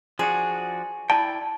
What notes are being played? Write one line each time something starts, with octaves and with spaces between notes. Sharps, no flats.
F3 D4 F#4 G#4
E4 D5 G5 A5